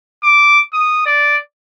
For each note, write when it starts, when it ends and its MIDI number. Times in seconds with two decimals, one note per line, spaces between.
0.24 0.60 86
0.73 1.02 87
1.06 1.37 74